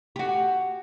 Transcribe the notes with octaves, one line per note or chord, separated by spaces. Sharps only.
F#4 G4